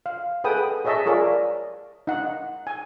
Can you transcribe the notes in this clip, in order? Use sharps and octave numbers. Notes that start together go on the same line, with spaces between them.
F5
G#4 A4 B4 F#5 G5 D#6
G#4 C#5 D#5 E5 A5 C#6
F4 G#4 A#4 C#5 D5
D#4 F#5
G#5